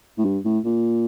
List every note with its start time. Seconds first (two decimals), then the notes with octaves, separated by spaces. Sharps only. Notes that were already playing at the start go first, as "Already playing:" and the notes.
0.18 A2
0.25 G2
0.45 A2
0.65 A#2